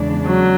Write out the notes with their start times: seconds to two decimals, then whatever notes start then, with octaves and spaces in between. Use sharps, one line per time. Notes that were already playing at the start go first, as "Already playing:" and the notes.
Already playing: E2 C#3 G#3 D4
0.26 F#3